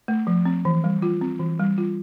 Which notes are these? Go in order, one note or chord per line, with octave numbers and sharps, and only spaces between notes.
A3
F3
C4
E3
G3
F4
C4
E3
G3
F4